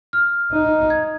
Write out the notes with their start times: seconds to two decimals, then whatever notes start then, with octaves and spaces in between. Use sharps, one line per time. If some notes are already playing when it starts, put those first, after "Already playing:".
0.13 F6
0.52 D#4
0.90 G#6